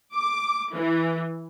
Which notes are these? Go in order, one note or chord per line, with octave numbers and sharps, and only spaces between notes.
D6
E3